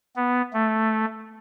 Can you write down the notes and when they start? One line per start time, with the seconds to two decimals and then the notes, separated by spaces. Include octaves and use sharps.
0.16 B3
0.53 A3